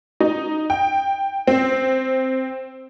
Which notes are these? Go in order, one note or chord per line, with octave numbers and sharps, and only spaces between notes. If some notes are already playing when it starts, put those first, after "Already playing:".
D#4
G5
C4